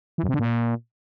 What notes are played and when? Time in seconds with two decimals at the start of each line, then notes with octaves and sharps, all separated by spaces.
0.18 E3
0.23 F#2
0.29 C3
0.34 D3
0.39 A#2